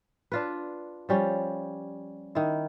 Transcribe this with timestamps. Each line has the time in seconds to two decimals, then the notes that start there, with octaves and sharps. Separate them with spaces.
0.32 D4 F4 B4
1.09 F3 G3 C#4
2.35 D#3 E4